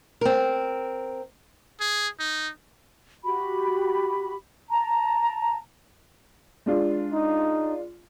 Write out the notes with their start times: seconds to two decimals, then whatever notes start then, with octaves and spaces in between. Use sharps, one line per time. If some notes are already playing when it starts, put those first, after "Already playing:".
0.21 C4 A#4
1.80 G#4
2.20 D#4
3.25 F#4 G4 B5
4.70 A5 A#5
6.66 G#3 D4 F4
7.13 D#4